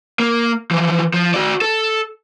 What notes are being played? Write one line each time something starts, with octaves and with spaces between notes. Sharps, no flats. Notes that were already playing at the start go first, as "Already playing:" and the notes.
A#3
E3 F3
F3
F#4 D5
A4